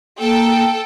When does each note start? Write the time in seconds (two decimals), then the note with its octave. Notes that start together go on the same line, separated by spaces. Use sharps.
0.19 A#3 A4 G5